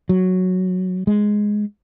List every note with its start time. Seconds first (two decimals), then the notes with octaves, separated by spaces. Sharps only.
0.09 F#3
1.07 G#3